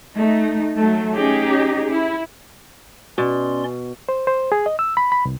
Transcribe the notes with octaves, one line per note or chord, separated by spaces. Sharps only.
A3 D#4
F#3 A3
C#4 D#4 G4 G#4
E4
B2 C#4 D5 C6
C5
C5
G#4
D#5
E6
B5
B5
C2